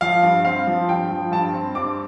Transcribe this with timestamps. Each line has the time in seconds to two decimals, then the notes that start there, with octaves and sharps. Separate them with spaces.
0.01 F3 F5
0.23 G2
0.45 C4 F5
0.67 F3
0.88 G2 G5
1.11 F3
1.32 G2 A5
1.53 C4
1.75 G2 D6